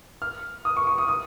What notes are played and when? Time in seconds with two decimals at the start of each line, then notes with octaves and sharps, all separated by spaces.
0.22 F6
0.65 D#6
0.77 C#6
0.87 C#6
0.98 D#6
1.08 D#6